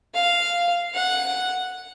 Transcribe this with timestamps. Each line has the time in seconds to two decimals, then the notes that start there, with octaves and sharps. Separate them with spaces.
0.15 F5
0.95 F#5